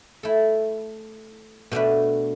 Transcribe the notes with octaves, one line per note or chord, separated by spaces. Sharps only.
A3 E4 A4
B2 A3 D4 B4